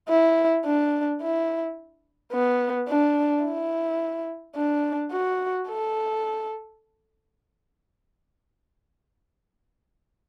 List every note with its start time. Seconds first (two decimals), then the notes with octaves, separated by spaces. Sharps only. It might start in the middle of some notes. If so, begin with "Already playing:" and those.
0.09 E4
0.65 D4
1.21 E4
2.33 B3
2.89 D4
3.44 E4
4.56 D4
5.12 F#4
5.68 A4